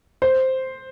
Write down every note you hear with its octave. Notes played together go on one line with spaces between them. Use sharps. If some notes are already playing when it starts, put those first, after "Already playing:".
C5